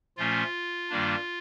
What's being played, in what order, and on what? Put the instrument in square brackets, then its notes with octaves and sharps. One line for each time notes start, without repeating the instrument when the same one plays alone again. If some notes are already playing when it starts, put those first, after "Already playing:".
[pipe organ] A#2 F3 A3 C#4 F4
G2 D#3 G3 A#3 D4